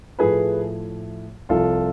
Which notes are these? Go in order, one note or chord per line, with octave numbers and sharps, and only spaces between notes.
A2 F3 A3 G#4 B4
C2 C3 F3 F4 A4